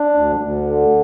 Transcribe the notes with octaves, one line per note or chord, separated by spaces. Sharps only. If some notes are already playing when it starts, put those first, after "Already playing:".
Already playing: D4
D2
D2
D3